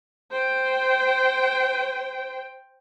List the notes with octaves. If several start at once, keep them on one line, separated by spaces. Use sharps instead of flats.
C5 G5